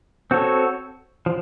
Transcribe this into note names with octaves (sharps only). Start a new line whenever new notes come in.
C4 F#4 A4 C#5
F3